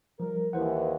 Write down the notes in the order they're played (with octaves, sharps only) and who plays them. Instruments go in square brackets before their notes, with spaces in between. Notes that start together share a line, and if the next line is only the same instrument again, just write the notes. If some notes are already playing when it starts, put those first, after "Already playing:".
[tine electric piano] F3 G3 [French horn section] A#4
[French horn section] D#2 E3 [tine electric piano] B4 C5 F#5